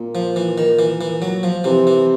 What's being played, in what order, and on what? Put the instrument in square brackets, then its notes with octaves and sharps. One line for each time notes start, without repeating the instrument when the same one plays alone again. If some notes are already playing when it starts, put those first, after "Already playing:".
Already playing: [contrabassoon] A#2
[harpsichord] F3
E3
D#3
E3
E3
F#3
F3
[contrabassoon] C3 [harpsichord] E3
[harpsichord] E3